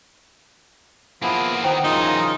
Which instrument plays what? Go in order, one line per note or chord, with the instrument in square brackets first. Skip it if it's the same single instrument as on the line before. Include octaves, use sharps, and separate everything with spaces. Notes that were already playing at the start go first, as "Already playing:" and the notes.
[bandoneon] F3 B3 E4 [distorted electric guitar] A#3 G#4
[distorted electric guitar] D#3 [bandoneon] B3 A#5 [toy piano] E4 C5 G5
[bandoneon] C#3 F4 A#4 [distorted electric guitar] E3 F#3 [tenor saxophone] D#4